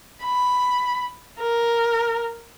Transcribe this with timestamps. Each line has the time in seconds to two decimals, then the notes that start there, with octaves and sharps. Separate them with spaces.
0.24 B5
1.41 A#4